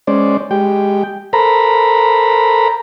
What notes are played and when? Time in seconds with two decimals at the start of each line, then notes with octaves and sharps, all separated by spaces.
0.07 G#3 C#4 C5 D5
0.51 G#3 G4 G5
1.33 A4 A#4 C5 A#5 B5